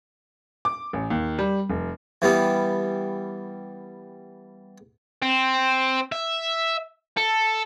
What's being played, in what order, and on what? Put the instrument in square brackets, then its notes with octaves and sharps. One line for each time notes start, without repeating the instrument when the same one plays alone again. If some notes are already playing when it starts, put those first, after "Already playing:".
[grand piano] D6
A1
D#2
G3
F1
[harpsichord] E3 G3 B3
[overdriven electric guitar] C4
E5
A4